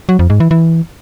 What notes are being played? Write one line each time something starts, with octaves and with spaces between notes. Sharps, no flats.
F#3
F2
G#2
E3
E3